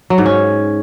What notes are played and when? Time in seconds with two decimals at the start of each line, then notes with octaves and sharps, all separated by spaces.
0.10 F#3
0.18 G#2
0.26 C#4